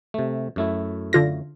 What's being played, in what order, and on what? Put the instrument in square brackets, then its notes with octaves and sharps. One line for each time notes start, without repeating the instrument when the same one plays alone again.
[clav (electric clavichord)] C3 A3
F#2 A3 E4
[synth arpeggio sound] D3 F4 A#6